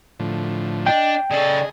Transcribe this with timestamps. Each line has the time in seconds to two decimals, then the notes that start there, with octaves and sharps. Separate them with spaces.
0.19 A2 D3 F3
0.86 D4 D#5 G5
1.31 C#3 G#4 A4 D5 D#5